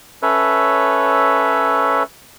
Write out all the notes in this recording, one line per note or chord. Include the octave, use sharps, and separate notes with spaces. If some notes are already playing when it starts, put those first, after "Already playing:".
C#4 A4 B4 C#5 E5